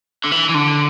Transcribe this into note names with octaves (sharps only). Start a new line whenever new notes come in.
D3
E3
E3
D3